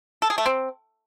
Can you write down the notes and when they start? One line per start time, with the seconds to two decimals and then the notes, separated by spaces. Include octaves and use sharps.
0.22 A4
0.30 G#4
0.38 A3
0.46 C4